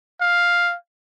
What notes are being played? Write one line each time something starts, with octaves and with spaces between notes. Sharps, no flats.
F5